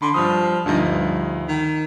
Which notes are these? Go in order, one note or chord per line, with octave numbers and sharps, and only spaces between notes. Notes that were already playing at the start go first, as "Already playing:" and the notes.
D3 B5 C6
G2 F3 B5 D#6
D2 G2 F3 D#4
G2
D#3